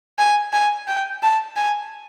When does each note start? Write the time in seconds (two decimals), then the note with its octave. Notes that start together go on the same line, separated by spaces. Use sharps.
0.19 G#5
0.53 G#5
0.88 G5
1.23 A5
1.56 G#5